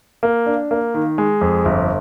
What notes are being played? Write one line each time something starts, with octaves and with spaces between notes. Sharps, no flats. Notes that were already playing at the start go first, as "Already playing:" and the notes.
A#3
D4
A#3
D#3
G#3
F2
G1